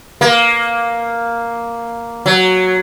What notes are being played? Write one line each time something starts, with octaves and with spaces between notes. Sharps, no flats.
A#3
F#3